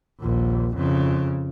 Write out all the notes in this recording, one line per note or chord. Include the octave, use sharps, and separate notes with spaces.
A#1 D#2
F2 C#3